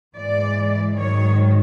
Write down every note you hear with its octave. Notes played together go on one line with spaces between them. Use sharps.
G#2 E3 G#3 D5
G#2 D#3 F#3 C#5